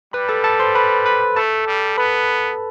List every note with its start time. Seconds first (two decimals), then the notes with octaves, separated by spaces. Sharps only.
0.13 G3 B4 B5
0.29 A4 A5
0.44 A4 A5
0.60 C5 C6
0.75 B4 B5
1.06 B4 B5
1.36 A3 A4 A5
1.67 G3
1.98 B3 B4 B5